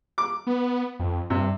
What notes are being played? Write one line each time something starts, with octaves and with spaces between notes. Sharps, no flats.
D6
B3
F2
G2 C3